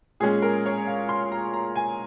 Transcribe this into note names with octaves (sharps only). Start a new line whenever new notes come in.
A#2 G#3 C#4 G#4
A#4
C#5
F5
C6
A#5
A#5
G#5